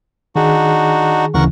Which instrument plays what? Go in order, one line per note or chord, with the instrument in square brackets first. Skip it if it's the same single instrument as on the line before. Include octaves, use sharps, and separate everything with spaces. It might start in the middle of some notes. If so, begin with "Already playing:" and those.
[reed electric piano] D#3 G#4 [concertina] D4 D#4 F#4
[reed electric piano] D2 C#3 E3 [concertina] A#4 F#5 C#6